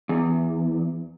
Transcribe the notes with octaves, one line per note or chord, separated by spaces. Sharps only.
E2